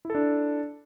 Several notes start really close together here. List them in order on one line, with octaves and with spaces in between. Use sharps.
E4 A4 D4